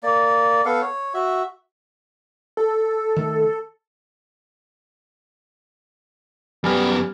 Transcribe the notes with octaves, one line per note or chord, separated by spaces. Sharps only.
A#3 D5
B3 A4 F5 F#5
C#5
F#4 E5
A4
D#3 A3
F#2 G3 B3 G#5 F6